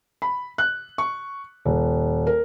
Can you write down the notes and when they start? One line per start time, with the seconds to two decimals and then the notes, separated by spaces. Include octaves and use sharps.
0.22 B5
0.58 F#6
0.98 C#6
1.65 D#1
2.27 A#4